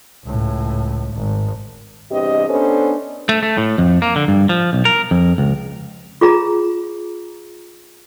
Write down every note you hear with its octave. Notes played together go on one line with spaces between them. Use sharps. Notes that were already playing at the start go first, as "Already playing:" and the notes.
C#2 A2
G#1
E2 G2 C3 G4 D#5
B3 C#4 D4 A4 B4 C5
A3
A3
A2
F2
A#3
D3
G2
F3
B1
A#4
F2
C#2
F4 G#4 A#5